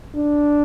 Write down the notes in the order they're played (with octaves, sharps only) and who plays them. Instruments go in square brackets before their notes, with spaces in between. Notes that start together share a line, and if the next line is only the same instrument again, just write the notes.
[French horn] D4